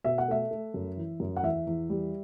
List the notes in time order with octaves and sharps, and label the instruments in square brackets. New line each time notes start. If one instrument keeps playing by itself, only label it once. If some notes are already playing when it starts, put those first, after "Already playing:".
[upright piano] B2 E5
F#5
A3 E5
A3
F#2
E3
F#2
F#5
E2 E5
E2
G3